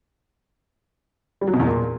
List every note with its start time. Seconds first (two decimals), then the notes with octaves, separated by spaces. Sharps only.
1.41 G3
1.47 F#3
1.54 B2
1.60 E2
1.66 A#2